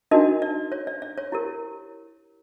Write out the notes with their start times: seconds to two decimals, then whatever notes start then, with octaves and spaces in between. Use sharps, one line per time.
0.11 D4 D#4 F#4 A#4 D#5
0.42 D5
0.72 C#5
0.87 D5
1.02 D5
1.18 C#5
1.32 E4 G4 A#4